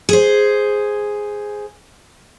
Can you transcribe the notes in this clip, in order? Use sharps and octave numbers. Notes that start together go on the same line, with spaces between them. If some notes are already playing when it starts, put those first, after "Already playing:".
G#4 C5